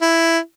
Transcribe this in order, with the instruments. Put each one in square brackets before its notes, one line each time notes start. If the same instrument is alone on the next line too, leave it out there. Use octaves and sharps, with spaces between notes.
[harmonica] E4